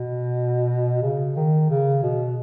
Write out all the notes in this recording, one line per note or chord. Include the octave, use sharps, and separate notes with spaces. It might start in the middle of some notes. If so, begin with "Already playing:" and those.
Already playing: B2
C#3
D#3
C#3
B2